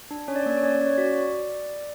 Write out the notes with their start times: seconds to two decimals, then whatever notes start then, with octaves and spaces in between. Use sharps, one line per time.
0.11 D4
0.28 C#4 C#5
0.36 D5
0.43 C#5
0.46 A#3 D5
0.57 C#5
0.63 C#4 D5
0.72 C#5
0.81 C#4
0.86 C#5
0.98 F#4 D5